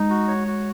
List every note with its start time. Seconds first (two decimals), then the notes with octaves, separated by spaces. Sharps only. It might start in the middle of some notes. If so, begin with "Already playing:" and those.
Already playing: G#3 D#4
0.10 F#4
0.28 C#5
0.48 F#4